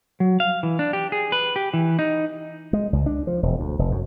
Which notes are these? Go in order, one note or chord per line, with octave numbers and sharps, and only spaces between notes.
F#3
F5
E3
D4
G4
G#4
B4
G4
E3
D#4
G#3
C#2
D4
F3
E1
D2
F1
F#2